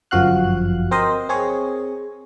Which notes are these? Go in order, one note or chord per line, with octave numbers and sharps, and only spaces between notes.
G1 F#2 F3 F#4 F5 F#6
C4 A#4 C5 D#5
C4 G#4 C#5